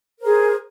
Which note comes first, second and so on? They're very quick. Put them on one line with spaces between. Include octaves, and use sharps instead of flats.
A#4 C5 G#4